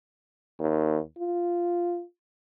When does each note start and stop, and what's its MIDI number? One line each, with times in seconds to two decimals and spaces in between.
0.59 0.98 39
1.18 2.03 65